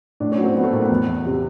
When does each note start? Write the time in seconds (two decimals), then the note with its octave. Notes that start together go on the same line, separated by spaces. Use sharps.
0.20 A2 D4
0.32 C#4
0.38 F#3
0.44 C4
0.55 F#3 B3
0.64 A3
0.73 A2 A#3
0.82 B3
0.90 E2
1.07 E2
1.26 C3